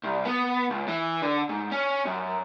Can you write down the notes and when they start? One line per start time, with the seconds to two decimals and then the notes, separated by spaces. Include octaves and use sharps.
0.03 C2
0.25 B3
0.70 C#2
0.88 E3
1.22 D3
1.49 G#2
1.71 C#4
2.05 F#2